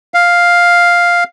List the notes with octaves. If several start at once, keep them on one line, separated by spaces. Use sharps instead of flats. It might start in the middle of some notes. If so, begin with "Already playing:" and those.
F5